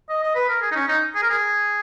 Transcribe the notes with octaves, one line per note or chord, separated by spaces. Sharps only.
D#5
D#5
B4
A#4
G#4
D#4
C#4
D#4
G#4
A#4
G#4